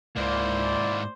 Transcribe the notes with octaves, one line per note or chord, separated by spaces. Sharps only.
C#2 G#2 A#3 E4 C5 D5